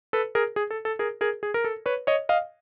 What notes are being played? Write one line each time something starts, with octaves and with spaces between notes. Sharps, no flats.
A4 B4
G#4 A#4
G#4
A4
A4
G#4 A#4
G#4 A#4
G#4
A#4
A4
B4 C#5
C#5 D#5
D#5 F5